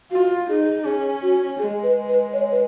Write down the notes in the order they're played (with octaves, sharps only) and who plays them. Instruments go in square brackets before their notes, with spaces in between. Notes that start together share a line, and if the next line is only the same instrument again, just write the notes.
[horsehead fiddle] F4 [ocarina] F#4
[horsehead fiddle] D#4 [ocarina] G#4
[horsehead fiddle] C#4 [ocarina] G#4
[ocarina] F#4
[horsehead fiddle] G#3 [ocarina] G#4
[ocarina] B4
B4
C#5
B4